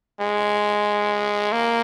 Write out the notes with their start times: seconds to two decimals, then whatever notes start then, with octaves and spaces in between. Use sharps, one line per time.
0.21 G#3
1.52 A#3